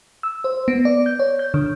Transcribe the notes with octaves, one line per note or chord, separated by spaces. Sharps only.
E6
C5
B3
D5
G6
C#5
G6
D3